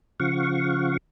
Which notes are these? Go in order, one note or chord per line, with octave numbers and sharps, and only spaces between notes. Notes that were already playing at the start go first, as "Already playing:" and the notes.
C#3 F3 F5 F#5 C#6